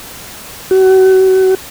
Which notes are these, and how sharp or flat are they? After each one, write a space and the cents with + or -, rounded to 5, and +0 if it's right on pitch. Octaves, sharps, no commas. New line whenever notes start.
F#4 +35